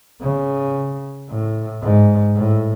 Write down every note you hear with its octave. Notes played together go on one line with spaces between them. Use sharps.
C#3
A2
G#2
A2